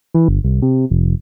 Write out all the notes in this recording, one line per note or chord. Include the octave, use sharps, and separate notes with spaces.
E3
G1
C2
C3
F1